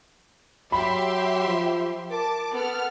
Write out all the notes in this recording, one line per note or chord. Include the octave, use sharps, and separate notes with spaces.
F#3 G4 E5 B5 C6
F3
A#4 A5 D6
B3 A4 F6